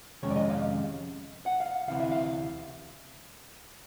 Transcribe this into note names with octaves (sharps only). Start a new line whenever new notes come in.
F2 C3 D#3 G#3 C#4 C#5
D5
D#5
F5
F#5
F5
D2 C3 E3 F5
E5
F5